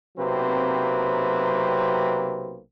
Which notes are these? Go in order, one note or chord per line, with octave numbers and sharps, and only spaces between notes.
B1 C3 F#3 A#3 C4 B4